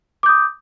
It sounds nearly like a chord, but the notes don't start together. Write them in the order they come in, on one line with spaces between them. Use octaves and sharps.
D6 G6 D#6